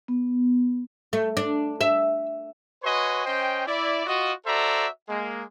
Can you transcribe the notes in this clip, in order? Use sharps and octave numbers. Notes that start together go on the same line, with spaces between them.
B3
A3
D4
E5
F#4 B4 C#5 D#5 G#5 C6
C#4 C5 D#5 G5
E4 D5
F4 F#4 D#5
F#4 A4 C5 D5 E5 A#5
G#3 A#3